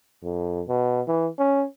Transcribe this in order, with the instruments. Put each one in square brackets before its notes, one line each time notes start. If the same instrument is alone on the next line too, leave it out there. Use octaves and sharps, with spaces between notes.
[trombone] F2
B2
E3
C#4